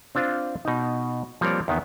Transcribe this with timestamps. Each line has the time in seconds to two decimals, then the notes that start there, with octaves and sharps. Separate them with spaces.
0.15 C4 D4 F4 C5 F5
0.65 B2 D#4
1.41 F3 G3 A#3 C4 C#5 D5
1.68 E2 D#3 B3